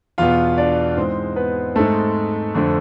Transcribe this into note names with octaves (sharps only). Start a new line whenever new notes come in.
E2 B2 B3 F4 F5
D4 D5
G#2 E3 G#3 C4 C5
B3 B4
G#2 G#3 A3 C4 A4
F2 D3 A3 C4